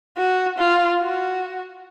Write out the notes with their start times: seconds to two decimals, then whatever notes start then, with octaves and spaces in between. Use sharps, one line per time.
0.18 F#4
0.58 F4
1.01 F#4